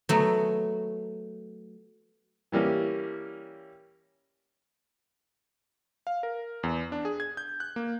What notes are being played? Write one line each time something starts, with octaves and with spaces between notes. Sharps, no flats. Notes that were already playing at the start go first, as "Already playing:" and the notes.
F#3 A3 B3
E3 G3 A#3 C#4
F5
A#4
E2
D4
G#4
G#6
G6
F#6
A#3